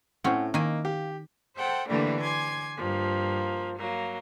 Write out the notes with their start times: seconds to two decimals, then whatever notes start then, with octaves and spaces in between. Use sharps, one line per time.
0.24 A2 C4 C#4 F#5 G#5
0.54 D#3 A#3 E4 D#5 G#5
0.85 G4 F5
1.56 A4 C5 F#5 G5
1.88 D3 E3 G3 A3 A#3 D4
2.19 G#5 C6 D6 G#6
2.76 G2 F3 A#3
3.77 F#3 A#3